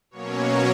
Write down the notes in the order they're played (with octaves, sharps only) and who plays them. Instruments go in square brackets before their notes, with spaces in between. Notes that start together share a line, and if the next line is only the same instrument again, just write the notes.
[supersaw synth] B2 F#3 A#3 C#4 C#5